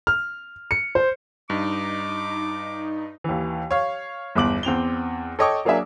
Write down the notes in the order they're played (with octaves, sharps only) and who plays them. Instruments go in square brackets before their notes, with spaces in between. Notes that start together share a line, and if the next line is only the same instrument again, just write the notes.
[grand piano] F6
C#7
C5
[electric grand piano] G2 [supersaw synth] D#4 [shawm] D6
[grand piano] D#2 E3
C#5 F5
G1 E2 D6 F#7
E2 C4 F7 G7
A4 C#5 D#5 G5 C#6 D6
F#3 A#3 D4 G#4 E5